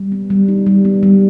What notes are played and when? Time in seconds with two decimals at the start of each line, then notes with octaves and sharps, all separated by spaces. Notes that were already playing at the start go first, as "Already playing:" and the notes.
Already playing: G3
0.12 B3
0.30 G3
0.48 D#4
0.67 G3
0.85 B3
1.03 G3